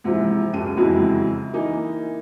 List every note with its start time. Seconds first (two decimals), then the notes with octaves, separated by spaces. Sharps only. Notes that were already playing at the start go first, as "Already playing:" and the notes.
0.04 G#2 C3 E3 F3
0.53 C#2 F#2 G4 A5 D#7
0.77 F2 C#3 E3 F#3 G#3 E4
1.53 E3 A#3 D#4 G#5